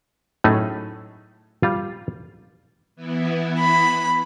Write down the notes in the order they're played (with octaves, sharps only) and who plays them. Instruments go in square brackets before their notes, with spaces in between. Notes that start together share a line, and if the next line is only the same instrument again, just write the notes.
[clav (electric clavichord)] A2 F#3 A3 C#4 D#4 G#4
G3 F4
[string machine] E3 B3 E4
[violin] B5